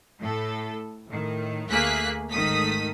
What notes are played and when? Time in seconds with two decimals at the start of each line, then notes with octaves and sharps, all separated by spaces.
0.21 A2 A4
1.07 A2 D#3
1.70 D2 A3 A#3 G#4 F#6 B6
2.30 G#1 D#3 A3 D#6 B6